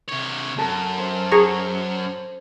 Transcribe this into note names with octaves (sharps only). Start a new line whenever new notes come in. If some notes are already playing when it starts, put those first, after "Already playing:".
C3 C#5
F#2 A4 A5 A#5
C5
G#4 A#5 C#6